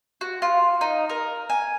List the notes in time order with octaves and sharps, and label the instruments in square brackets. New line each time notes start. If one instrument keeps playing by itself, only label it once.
[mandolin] F#4
F4
D#4
A#4
G#5